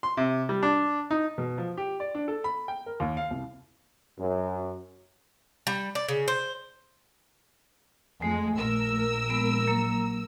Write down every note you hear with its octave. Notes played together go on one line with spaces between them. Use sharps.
C6
C3
G3
D4
D#4
B2
F3
G4
D5
D4
A4
B5
G5
A#4
D#2
F5
C2
F#2
G3
D5
C#3
C5
F2 G#3 A3
A#1 A#4 E6
G#3 B3
F#3 A#3 A#5